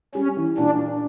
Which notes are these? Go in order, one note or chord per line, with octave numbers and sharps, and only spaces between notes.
G3 C#4
E3
A#2 D4
D4